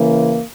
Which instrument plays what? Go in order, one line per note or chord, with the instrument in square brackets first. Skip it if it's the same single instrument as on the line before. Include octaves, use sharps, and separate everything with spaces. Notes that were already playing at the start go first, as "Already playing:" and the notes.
Already playing: [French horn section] C#3 E3 A#3